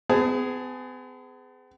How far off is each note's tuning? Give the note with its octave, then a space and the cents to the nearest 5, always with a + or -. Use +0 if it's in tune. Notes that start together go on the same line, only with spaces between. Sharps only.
B3 +45 G#4 +0 A5 +0